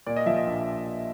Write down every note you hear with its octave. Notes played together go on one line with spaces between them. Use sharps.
A#2 D5
D#5
F3 E5
D#5
A#1